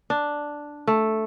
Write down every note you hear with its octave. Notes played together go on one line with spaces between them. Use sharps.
D4
A3